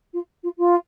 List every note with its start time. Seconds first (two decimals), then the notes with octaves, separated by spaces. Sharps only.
0.13 F4
0.43 F4
0.57 F4